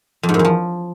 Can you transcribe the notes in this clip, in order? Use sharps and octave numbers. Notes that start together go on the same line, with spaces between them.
F2
G#2
F#2
E2
F3